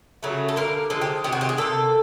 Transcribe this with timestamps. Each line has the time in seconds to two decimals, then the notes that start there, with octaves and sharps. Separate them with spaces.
0.23 C#3 F#3 A3
0.49 A4
0.56 D3 G3 A#3 A#4
0.90 D3 F3 G#3 A4
1.01 G4
1.24 C3 D#3 G#3 G4
1.32 F#4
1.41 G4
1.49 G#4
1.57 C3 F3 A#3 A4